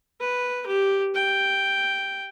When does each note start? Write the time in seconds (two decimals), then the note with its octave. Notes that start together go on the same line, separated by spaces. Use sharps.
0.20 B4
0.67 G4
1.15 G5